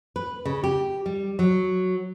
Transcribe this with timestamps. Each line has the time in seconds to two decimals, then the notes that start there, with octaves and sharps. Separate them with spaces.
0.16 B4
0.45 C#3
0.64 G4
1.06 G3
1.39 F#3